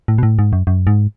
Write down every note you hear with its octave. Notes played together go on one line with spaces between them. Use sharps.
A2
B2
A2
G#2
F#2
F#2
G#2